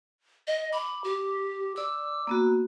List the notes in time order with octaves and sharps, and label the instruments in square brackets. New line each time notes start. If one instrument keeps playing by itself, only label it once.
[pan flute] D#5
[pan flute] B5 [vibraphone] D6
[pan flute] G4
[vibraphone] D5 D6 [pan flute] E6
[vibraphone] A#3 B3 F#4